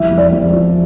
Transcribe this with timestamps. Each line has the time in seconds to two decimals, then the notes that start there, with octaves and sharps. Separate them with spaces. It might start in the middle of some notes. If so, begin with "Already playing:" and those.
Already playing: C2 F2 E5
0.11 F2
0.18 D5
0.33 F2
0.53 F3